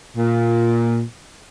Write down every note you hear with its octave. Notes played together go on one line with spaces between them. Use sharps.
A#2